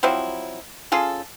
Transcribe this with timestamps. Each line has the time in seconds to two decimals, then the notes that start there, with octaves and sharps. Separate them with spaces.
0.03 F3 F#3 C4 E4
0.92 C#4 F4 G#4 A4